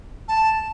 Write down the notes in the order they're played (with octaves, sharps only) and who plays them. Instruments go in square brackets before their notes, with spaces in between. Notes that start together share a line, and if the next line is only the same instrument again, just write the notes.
[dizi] A5